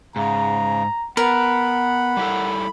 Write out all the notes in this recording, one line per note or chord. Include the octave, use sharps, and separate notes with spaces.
G#2 C#3 A#5
B3 A#4 F#5 B5
G3 E4 A4